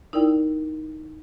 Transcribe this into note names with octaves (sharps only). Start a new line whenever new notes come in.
D#4 E4 A#4 D5 G5